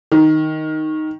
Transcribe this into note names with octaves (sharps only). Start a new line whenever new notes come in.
D#3